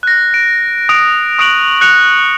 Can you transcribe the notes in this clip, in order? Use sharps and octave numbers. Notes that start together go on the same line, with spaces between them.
F#6 A#6
D7
D#6 D7
C#6 D#6 F#6 D7 F7 F#7
F#6 C#7 D7 F7